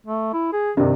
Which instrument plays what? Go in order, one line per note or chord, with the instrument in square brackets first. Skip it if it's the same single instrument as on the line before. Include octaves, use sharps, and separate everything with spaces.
[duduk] A3
E4
G#4
[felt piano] G2 C3 [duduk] D#3